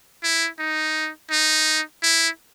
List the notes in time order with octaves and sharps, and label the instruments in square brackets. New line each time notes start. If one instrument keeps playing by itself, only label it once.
[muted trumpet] E4
D#4
D#4
E4